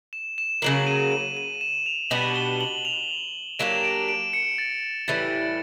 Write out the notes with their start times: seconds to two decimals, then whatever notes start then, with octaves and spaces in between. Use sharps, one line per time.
0.13 E7
0.38 E7
0.62 C#3 F#3 A#3 F#7
0.87 D#7
1.12 D#7
1.37 D#7
1.61 E7
1.86 F7
2.10 B2 G3 B3 D4 F#7
2.35 G7
2.61 F#7
2.85 F7
3.59 F#3 A#3 D4 G4 E7
3.84 D7
4.09 D7
4.33 C#7
4.58 A6
5.08 A2 E3 G3 A6